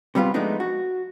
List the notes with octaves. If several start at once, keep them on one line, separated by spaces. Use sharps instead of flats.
C3 G3 B3 F4
F3 G#3 A3 B3 D4 D#4
F#4